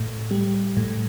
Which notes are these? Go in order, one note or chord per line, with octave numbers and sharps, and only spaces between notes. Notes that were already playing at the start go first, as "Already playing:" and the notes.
Already playing: A2
G3
A2